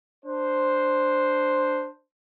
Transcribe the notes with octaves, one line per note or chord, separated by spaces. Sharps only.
D4 C5